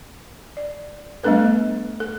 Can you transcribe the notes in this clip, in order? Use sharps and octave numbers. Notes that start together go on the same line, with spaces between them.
D5
G3 A3 B3 D4 A4 B4
A4